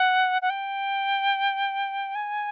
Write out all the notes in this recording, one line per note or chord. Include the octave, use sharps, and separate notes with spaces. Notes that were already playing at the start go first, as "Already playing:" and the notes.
Already playing: F#5
F#5
G5
G#5